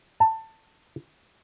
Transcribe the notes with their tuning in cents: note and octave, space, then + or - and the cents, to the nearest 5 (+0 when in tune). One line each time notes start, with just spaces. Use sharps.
A5 +20